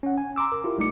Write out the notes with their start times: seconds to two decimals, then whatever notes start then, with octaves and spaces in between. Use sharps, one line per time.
0.03 C#4 F#5
0.18 G#5
0.36 A#5 C6 D6 E6
0.52 A#4
0.64 E4 F4 G4 A#4
0.78 G#1 G3 A3 D#4 D6 C#7